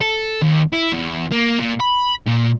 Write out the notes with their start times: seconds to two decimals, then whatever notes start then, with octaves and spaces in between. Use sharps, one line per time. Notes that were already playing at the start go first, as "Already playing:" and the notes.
0.01 A4
0.42 D#2
0.73 E4
0.93 E2
1.31 A#3
1.59 A#2
1.80 B5
2.27 A#2